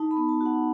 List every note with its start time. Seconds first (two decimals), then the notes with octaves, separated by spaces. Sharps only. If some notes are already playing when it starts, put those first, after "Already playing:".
Already playing: D#4 A5
0.11 B5
0.17 B3
0.29 A5
0.41 F#4
0.46 F#5